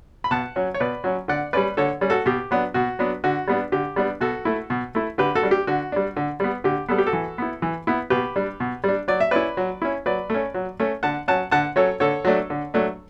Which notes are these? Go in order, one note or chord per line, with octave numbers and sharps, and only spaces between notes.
B5
B2 F#5 A5
F#3 C#4
C#5
B2 B4 D5
F#3 C#4
D3 D5 F#5
G3 C#4 B4 D5
D3 A4 C#5
G3 C#4
F#4 A4
B2 G4
F#3 B3 D4
B2 F#4
F#3 B3 D4
D3 F#4
G3 B3 D4
D3 G4
G3 B3 D4
B2 F#4 A4
A3 E4
B2
A3 E4
D3 G4 B4
F#4 A4
G3 D4
G4
D3 F#4
G3 D4
D3
G3 B3
D3 G4
G3 B3 A4
G4
F#4 A4
E3
B3 E4
E3
B3 E4
B2 G4 B4
G3 D4
B2
G3 D4
F#3 D5
E5
C#4 E4 B4 D5
F#3
C#4 E4
F#3 B4 D5
A3 C#4
F#3
A3 C#4
D3 F#5 A5
F#3 C#4 F#5 A5
D3 F#5 A5
F#3 C#4 A4 C#5
D3 A4 C#5
F#3 A3 D4
D3
F#3 A3 D4